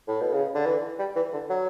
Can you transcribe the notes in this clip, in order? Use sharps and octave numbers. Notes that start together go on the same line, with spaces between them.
A2
B2
C#3
D3
E3
G3
E3
D3
F#3